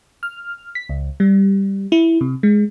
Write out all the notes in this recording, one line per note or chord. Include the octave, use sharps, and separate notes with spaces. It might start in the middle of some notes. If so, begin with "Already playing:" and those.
F6
B6
C#2
G3
E4
C3
G#3